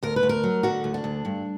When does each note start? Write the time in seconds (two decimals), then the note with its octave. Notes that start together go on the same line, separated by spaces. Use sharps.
0.03 D2 A#4
0.16 B4
0.23 D2
0.29 A#4
0.43 F#3
0.63 D3 F#4
0.84 D2
0.94 D4
1.04 D2
1.25 G2